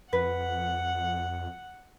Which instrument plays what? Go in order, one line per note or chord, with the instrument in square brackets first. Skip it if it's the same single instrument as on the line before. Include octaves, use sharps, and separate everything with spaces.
[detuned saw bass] F2 [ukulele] B4 [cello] F#5